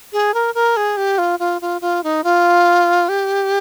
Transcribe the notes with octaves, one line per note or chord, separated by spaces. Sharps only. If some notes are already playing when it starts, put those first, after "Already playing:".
G#4
A#4
A#4
G#4
G4
F4
F4
F4
F4
D#4
F4
G4